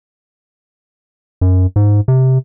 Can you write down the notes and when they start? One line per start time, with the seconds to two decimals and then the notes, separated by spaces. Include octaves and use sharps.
1.41 F#2
1.76 G#2
2.08 C3